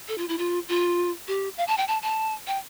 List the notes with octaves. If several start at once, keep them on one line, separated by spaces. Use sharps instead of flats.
A4
F4
E4
F4
F4
G4
F5
A5
G5
A5
A5
G5